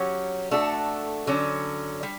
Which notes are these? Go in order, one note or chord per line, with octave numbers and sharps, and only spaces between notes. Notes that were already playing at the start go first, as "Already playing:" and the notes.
Already playing: F#3 C#4 G4 C#5
A3 D4 F#4 A4
D3 F#3 C#4
G3